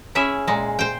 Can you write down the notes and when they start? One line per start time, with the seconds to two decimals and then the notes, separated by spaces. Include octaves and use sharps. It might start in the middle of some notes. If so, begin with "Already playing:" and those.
0.15 C#4 E4 G#4 E5
0.47 A#2 G#3
0.79 C5 G5